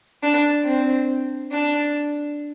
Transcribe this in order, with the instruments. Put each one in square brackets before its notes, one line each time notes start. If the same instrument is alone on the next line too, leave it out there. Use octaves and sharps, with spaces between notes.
[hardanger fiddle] D4
C4
D4